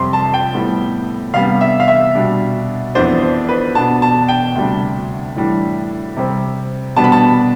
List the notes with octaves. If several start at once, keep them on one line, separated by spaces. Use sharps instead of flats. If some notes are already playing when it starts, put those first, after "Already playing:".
Already playing: F2 C3 G3 C4 C6
A5
G5
A2 G3 B3
C3 G3 B3 D4 F5
E5
F5
E5
B2 G3 D4
F2 E3 B3 D4 C5
C5
B4
B2 B3 D4 A5
A5
G5
D2 C3 G3 D4
A2 E3 G3 D4
C3 G3 C4
B2 G3 B3 D4 A5
B5
A5